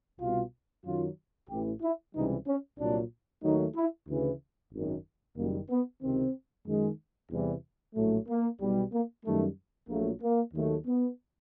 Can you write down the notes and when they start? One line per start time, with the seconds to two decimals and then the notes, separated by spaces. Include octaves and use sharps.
0.20 C2 B2 G3 F4
0.85 F#2 D#3 F#3 F4
1.49 A1 A2 E3 G4
1.82 E4
2.14 C#2 C3 E3 G3 D#4
2.46 C#4
2.79 C2 A#2 F#3 D4
3.43 D#2 D#3 F#3 A3 D#4
3.75 E4
4.07 D2 C#3 E3
4.72 G#1 F#2 D#3
5.37 F#1 F#2 D#3 G3 A#3
5.70 B3
6.01 C#2 C3 D#3 C4
6.66 F#2 D#3 G#3
7.31 E2 C3 E3 G3
7.95 A#1 A2 F#3 A3
8.28 A#3
8.60 B1 B2 G3
8.92 A#3
9.25 F#2 D#3 G3 A3
9.89 A#1 A#2 F#3 A3 A#3
10.21 A#3
10.54 D#2 D#3 F#3 A3
10.86 B3